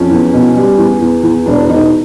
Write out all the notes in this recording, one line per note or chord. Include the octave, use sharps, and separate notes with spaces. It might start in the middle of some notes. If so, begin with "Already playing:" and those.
Already playing: F2 C#4
E2
B2
G3
E2
E2
E2
E1 D4
E1 D#4